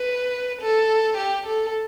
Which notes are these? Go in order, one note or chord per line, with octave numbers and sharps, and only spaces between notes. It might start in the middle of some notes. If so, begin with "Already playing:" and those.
Already playing: B4
A4
G4
A4